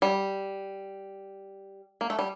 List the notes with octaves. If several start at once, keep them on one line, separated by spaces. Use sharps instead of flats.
G3
A#3
A3
G3